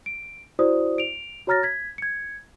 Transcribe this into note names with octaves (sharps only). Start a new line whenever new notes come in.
D7
E4 F#4 C5 D5 D#6
D7 F7
F#4 C#5 A#5 F6 A6 A#6
G#6 B6
G#6 C#7